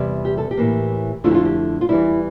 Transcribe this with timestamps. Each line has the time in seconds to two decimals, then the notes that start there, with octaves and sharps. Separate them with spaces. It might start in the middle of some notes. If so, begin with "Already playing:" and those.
Already playing: E2 C3 G3
0.25 G4
0.38 A4
0.51 G4
0.57 A2 E3 A#3
1.24 F2 D3 A3 E4 F4
1.31 G4
1.35 F4
1.45 G4
1.81 F4
1.89 E2 E3 G3 E4